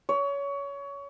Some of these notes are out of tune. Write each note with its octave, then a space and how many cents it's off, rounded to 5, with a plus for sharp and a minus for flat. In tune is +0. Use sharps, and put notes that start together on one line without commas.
C#5 +25